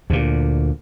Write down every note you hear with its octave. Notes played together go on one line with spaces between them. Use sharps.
D2 A#2